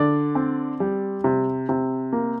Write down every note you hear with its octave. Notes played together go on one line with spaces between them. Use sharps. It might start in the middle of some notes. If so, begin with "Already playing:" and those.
Already playing: D3 D5
C4
G3
C3
C3
A#3